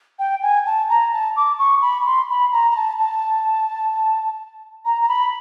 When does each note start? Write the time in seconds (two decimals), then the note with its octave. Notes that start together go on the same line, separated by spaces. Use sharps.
0.19 G5
0.42 G#5
0.66 A5
0.89 A#5
1.13 A5
1.36 D6
1.59 C#6
1.82 B5
2.06 C6
2.29 B5
2.52 A#5
2.71 A#5
2.76 A5
2.99 A5
4.85 A#5
5.01 A#5
5.08 B5